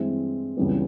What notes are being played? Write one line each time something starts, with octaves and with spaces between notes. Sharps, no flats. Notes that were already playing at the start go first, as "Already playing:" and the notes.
Already playing: G2 E3 G#3 C4 E4
C#2 C#3 E3 G3 B3